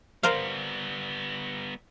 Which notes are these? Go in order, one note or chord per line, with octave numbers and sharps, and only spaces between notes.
G3 B3 A#4 C5 F5